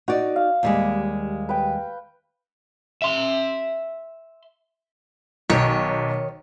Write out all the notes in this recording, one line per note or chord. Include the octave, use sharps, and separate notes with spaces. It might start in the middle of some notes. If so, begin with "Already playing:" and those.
D#4 F#4 D5
F5
D#2 G3 G#3
B4 G5
E5 C6
B1 D#3 C#5